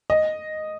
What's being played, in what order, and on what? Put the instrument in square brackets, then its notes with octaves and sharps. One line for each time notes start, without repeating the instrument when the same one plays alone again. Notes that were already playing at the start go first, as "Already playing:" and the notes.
[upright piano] D#5